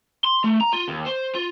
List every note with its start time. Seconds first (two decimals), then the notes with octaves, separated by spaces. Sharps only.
0.25 C6
0.44 A3
0.61 A#5
0.73 F4
0.88 D#2
1.06 C5
1.35 F4